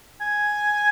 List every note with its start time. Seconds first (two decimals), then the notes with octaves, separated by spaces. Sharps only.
0.21 G#5